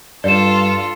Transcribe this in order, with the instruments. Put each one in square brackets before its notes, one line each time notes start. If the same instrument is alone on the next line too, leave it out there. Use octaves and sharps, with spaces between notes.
[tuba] G2 [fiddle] F4 A4 [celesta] D5 E7